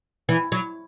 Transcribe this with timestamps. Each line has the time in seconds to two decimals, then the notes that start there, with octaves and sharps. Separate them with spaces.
0.29 E3
0.52 F#3